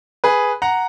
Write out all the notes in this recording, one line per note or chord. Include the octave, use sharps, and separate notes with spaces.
G#4 B4
F#5 A#5